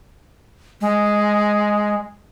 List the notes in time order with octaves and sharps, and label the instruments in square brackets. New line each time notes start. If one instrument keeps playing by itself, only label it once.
[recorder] G#3